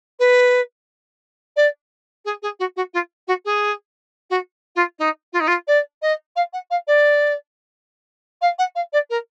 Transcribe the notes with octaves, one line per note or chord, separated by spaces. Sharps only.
B4
D5
G#4
G#4
F#4
F#4
F4
F#4
G#4
F#4
F4
D#4
F4
D#4
F4
D5
D#5
F5
F#5
F5
D5
F5
F#5
F5
D5
A#4